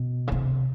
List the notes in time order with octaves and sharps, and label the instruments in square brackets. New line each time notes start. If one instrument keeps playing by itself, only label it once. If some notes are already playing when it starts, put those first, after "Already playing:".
Already playing: [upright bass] B2
C#3
C3